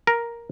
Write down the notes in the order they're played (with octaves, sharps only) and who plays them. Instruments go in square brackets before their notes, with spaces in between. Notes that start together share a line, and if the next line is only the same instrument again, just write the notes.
[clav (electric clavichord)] A#4